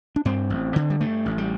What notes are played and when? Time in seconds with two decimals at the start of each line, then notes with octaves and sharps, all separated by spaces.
0.16 D4
0.25 G2 C4
0.50 A1
0.76 D3
0.90 G3
1.00 G2 A3
1.26 A1
1.38 G3